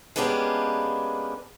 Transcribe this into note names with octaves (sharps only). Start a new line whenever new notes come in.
G#3 A#3 B3 C#4 D4 G4